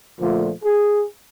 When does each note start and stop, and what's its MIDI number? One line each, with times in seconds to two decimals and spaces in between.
0.20 0.50 38
0.20 0.50 46
0.20 0.50 50
0.20 0.50 53
0.20 0.50 57
0.63 1.03 68